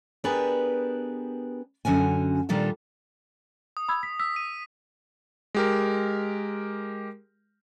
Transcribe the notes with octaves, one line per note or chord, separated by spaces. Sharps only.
B3 D4 G4 G#4 A#4 B4
F#2 D3 C#4 F#4 G#5
A#2 D#3 G3 D4 F4 A4
D#6
B5 E6 G#6
B6
E6 B6
D#7
G#3 G4 A#4